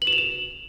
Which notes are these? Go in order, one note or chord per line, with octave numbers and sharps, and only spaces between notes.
F#7
E7
F7
E7